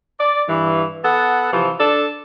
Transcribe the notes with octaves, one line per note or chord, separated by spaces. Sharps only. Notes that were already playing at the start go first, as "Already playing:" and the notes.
D5
G2 E3
B3 A4 F#5
C3 E3 F3
D4 A4